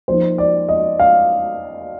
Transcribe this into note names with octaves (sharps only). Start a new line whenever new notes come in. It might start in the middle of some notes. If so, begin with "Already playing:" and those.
F3 A#3 D#4 C5
D5
D#5
F5